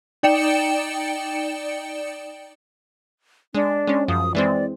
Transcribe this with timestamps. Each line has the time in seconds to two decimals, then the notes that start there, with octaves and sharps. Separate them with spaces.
0.23 D#4 D5 G5 C#7 E7
3.55 G#3 D4
3.88 G#3 C#4
4.08 F#2 F3 D#6
4.35 E3 G#3 C4 D5